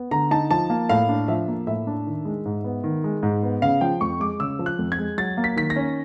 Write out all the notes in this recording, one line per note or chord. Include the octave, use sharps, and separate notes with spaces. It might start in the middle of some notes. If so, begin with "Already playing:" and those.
Already playing: B3
D3 A#5
D#4 A5
F3 A5
A#3
A2 F5
D4
F3 E5
A#3
A2 E5
D4
D#3
G#3
G#2
B3
D#3
G#3
G#2
B3
C#3 F5
F3 G5
F2 C#6
G#3 D6
C#3 E6
F3
F#6
F2
G#6
G#3
F#3 A6
A#3
B6
D#3 B6
A#6
C#4